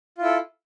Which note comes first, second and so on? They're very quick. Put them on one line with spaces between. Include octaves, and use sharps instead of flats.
F4 E4 A4